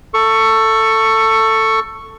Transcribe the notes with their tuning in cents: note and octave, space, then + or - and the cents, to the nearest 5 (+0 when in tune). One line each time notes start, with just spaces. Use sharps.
A4 +15 C#6 +0